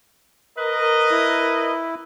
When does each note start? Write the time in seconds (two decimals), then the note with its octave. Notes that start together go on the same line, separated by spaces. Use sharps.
0.58 A#4 B4 D#5
1.11 E4